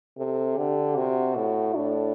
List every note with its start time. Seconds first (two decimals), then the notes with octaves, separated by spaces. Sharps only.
0.18 C3 A4
0.57 D3 G4
0.96 C3 F#4
1.36 A2
1.75 A2 D4